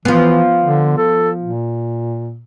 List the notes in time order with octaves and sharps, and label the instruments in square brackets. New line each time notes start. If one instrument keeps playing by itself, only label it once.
[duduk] E3 [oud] F3 B3
[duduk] D3
A4
A#2